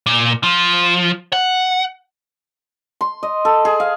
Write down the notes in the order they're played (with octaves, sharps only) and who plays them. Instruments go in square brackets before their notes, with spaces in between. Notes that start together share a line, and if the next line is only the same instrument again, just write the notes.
[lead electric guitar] A#2
F3
F#5
[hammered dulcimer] C6
D#5
A4
G#4
F5